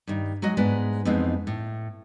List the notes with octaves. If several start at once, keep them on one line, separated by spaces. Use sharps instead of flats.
G2 D#3
F#3 G#3 F#4 D#5
G#2 G#3 B3 D4
F2 E3 G#3 B3 C4 D#4
A2